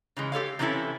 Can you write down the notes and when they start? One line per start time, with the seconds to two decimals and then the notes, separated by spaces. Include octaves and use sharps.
0.17 C#3 E3 G#3
0.32 G4 A4 C#5 F5
0.59 C3 E3 A3 C#4 E4 A4